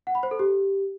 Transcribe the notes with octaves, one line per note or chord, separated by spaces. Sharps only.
F#5
B5
C5
A4
G4